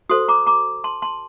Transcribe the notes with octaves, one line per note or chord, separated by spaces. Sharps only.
F#4 A4 C5 C6 D#6
A#5 D6
A#5 D6
A5 C6
A5 C6